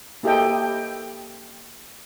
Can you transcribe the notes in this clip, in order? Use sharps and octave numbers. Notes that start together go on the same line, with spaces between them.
A#3 E4 G4 A4 D#5 G5